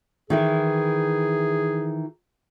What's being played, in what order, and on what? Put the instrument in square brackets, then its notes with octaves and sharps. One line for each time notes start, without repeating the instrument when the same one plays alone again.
[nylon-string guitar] D#3 E3 E4 [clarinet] G#4